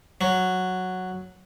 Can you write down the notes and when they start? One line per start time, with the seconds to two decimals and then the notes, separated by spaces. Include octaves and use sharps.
0.21 F#3